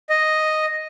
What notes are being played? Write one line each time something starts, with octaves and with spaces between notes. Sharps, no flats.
D#5